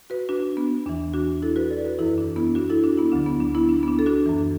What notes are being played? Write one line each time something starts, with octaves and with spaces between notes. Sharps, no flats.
F#4 B4
D4 F#4
B3
E2 E3 D4
D4 F#4
E4 A4
F#4 B4
A4 D5
F#4 B4
F#2 E3 E4 A4
D4
B3 E4
D4 F#4
E4 A4
D4 F#4
B3 E4
D2 D3 F#3 D4
B3
D4
B3 E4
D4
B3
D4
A4
D4 F#4
F#2 E3